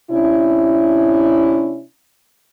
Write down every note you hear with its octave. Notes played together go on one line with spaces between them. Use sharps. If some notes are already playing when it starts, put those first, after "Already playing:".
C3 C#4 D4 E4